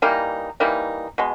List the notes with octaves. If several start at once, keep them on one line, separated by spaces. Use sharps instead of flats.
E3 G3 A#3 D#4
E3 G3 A#3 D#4
B2 G#3